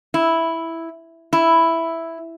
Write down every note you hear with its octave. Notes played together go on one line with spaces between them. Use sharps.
E4
E4